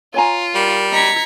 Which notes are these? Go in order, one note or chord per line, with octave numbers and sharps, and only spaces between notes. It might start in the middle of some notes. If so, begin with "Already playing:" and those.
F4 C#5 G#5 A#5
G3 A#4
D#5 A#5 G#6 B6 C#7